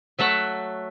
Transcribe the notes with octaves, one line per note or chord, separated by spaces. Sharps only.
F#3 A3 E5 F#5